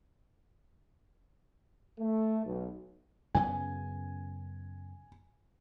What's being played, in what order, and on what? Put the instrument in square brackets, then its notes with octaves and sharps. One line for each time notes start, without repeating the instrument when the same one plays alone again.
[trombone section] A3
B1
[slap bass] F#2 C#3 B3 [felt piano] G#5